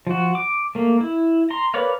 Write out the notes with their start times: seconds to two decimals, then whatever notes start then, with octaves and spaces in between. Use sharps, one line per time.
0.07 F3 F#4
0.35 D6
0.75 A3 A#3
1.01 E4
1.50 A#5 C6
1.74 A#4 B4 C#5 D5 F5